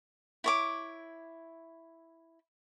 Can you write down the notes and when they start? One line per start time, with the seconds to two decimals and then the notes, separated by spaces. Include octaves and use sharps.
0.44 E4 C#5 D6